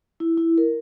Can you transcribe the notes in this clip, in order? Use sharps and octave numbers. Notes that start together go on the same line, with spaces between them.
E4
E4
A#4